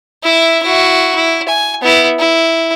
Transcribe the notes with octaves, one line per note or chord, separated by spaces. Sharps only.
E4 E5
E4 F#4
E4
G#5
B3 E4
E4